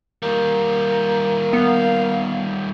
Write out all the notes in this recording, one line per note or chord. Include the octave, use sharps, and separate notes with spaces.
D#3 G3 A#3
B3 F5